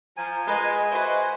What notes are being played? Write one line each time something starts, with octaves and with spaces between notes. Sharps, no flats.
F3 G#5 A#5
G#3 F4 B4 D#5
E4 F#4 B4 C5 D#5